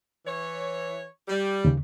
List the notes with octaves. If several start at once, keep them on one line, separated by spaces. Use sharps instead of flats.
E3 C#5
G3
D#2 C#3